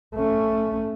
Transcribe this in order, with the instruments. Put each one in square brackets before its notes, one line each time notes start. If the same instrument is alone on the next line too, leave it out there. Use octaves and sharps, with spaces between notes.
[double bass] A3 C#4